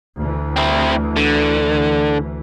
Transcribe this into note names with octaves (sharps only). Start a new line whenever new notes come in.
D2 E3
C4 E4
D3